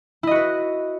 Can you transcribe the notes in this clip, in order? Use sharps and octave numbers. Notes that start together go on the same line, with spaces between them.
E4 F#4 B4 D#5